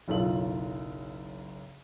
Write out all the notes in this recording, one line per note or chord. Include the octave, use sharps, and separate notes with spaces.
F#1 B1 F4 A4 F#7